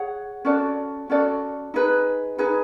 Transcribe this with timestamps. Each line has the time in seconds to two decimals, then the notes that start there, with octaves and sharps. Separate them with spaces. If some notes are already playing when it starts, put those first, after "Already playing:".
Already playing: G#4 C#5 F#5
0.45 C#4 F#4 A4 D5
1.10 C#4 F#4 A4 D5
1.74 D#4 G#4 B4
2.38 D#4 G#4 B4